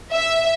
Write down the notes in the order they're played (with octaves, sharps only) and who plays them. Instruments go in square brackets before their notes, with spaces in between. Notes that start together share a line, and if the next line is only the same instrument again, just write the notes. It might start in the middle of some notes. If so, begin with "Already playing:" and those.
[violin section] E5